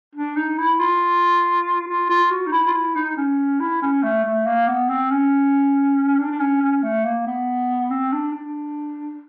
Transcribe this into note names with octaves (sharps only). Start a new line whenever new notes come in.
D4
D#4
E4
F4
F4
F4
F#4
D#4
E4
F4
E4
D#4
C#4
E4
C#4
A3
A3
A#3
B3
C4
C#4
D4
D4
C#4
C#4
A3
A#3
B3
C4
D4
D4